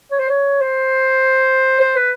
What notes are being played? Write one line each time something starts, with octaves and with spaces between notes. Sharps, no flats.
C#5
C5
C#5
C5
C5
B4